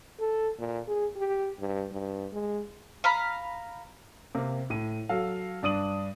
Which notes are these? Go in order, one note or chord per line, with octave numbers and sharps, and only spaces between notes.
A4
A#2
G#4
G4
G2
G2
G#3
F5 A#5 B5
C3 A#3
A2 D#7
F#3 A4 F5
G2 D4 D#6 D#7 F#7